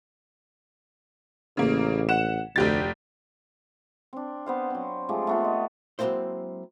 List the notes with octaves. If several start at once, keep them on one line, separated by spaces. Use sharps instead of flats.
A1 C#3 A#3
F#5 E7
F1 D2 G4 A6
C4 D4
B3 C5 F5
F#3 C4
F3 G#3 A3 G4
A3 B3 F4
D#5
F#3 G#3 A#3 C4 E4 C5